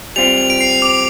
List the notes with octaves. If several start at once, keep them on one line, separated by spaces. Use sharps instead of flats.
G3 C4 F4 F7
F7
D7
C7
D6